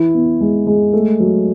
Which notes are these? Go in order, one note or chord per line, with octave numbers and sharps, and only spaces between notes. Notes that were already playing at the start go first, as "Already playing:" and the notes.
Already playing: E3 E4
B3
G#3
G#3
A3
F#3